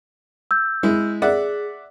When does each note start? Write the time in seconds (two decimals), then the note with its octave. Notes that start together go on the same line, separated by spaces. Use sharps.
0.51 E6 G6
0.83 G#3 E4
1.22 G#4 D5 E5 F#5